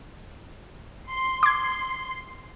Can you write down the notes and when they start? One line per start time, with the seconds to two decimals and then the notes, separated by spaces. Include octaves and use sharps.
1.09 C6 C7
1.43 D6 G#6